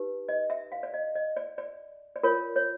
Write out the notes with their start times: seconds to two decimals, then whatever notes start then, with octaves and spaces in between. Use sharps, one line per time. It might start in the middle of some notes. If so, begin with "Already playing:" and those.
Already playing: D#4 G4 B4
0.29 D#5
0.50 E5
0.72 F5
0.83 D5
0.94 D#5
1.15 D#5
1.37 D5
1.58 D5
2.16 D5
2.23 F4 A#4 C#5
2.56 C#5